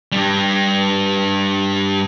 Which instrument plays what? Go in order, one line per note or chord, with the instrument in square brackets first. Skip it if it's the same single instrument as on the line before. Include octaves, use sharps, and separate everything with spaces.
[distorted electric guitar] G2 G3